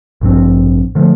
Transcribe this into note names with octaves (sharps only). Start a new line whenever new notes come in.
A1 G2 F3 C4
D3 F3 A3